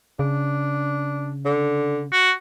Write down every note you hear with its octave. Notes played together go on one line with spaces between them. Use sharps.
C#3 D4
D3
F#4